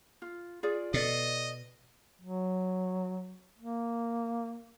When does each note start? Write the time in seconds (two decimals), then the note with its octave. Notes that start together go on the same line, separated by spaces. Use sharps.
0.22 F4
0.63 F4 G#4 D5
0.94 B2 A4 D5 D#5
2.21 F#3
3.59 A#3